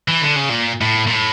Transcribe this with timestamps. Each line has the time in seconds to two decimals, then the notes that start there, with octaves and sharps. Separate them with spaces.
0.08 E3
0.22 D3
0.36 C#3
0.49 A#2
0.81 A2
1.07 A#2
1.13 A2